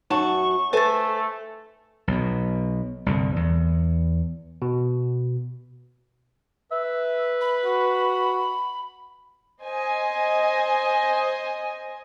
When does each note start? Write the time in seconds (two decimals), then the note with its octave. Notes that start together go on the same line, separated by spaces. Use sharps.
0.10 F#2 D#4 F#4 A5 C#6
0.73 A3 A4 B4 C5 G#5 A6
2.08 B1 B2
3.06 C2 G2 D3
3.36 E2
4.62 B2
6.72 B4 E5
7.41 B5
7.65 F#4
9.63 C5 D#5 G#5